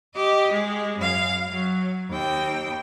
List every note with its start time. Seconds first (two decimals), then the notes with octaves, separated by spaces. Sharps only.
0.15 G4 D#5
0.52 G#3
0.98 F#2 F5
1.50 F#3
2.09 D#2 G5